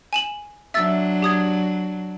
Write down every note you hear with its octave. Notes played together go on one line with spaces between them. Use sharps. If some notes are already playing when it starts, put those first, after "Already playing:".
G#5 E7 F#7
F#3 D4 E5 E6 A6
G4 D#6 G#6